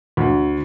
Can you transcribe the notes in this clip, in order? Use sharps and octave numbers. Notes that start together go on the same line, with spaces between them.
D2